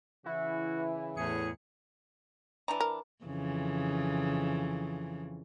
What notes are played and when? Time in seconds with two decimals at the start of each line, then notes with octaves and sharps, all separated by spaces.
0.26 C#3 E3 E4 F#4
1.17 E2 A2 G#4 C#7
2.68 E3 D4 A#5
2.81 A#4
3.24 F2 C#3 E3